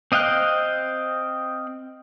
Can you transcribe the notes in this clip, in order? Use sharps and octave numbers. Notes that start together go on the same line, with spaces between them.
C4 D#5 F5 G5 F#6